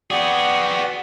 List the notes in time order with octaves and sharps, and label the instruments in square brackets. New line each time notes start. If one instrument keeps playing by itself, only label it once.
[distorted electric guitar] B3 G#4 [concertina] F#4 D5 G5 [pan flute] F#5